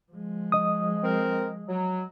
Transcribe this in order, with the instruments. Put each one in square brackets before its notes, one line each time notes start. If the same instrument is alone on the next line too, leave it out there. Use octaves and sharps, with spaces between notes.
[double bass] F3 G#3
[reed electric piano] D#5 D#6
[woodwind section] C4 A#4
F#3